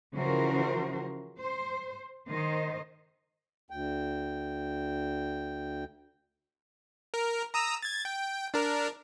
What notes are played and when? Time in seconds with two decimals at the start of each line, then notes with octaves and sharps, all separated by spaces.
0.15 C#3 E3 F3 F#4 A#4 C5
1.41 C5
2.30 D#3 C5 D#5
3.70 D2 G5
7.14 A#4
7.54 A#5 D#6 E6
7.83 G#6 A6
8.05 G5
8.54 D4 A#4